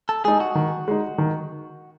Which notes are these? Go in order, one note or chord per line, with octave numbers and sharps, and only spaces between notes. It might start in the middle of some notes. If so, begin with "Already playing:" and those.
A4
G#3 D#4 G#4
F#4
D#3
G#3 D#4
D#3